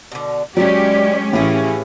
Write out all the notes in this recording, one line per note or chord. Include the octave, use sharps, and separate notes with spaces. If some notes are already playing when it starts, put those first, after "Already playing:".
B2 D3
F#3 G#3 C#4 D#4 G4 D5
A2 E3 C#4 F4 G4 G#4